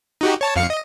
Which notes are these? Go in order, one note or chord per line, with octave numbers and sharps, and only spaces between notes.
D#4 F#4 G4
C#5 A5
F2 F5 C#7
D#5